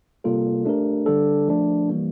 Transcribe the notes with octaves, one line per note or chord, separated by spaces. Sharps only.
C3 G3 A#3 F4 A4
A3 D4 G4 A#4
D3 G3 D4 A4
F3 A3 D4
E3 G3 A#3